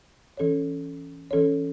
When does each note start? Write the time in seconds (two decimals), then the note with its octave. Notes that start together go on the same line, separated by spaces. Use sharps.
0.37 E3 C#4 A4 C#5
1.31 E3 C#4 A4 C#5